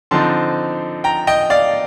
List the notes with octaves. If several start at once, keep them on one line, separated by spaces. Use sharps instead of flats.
D3 F3 C4 D#4 A5 C6
G5 A#5
D#5 G5
D5 F5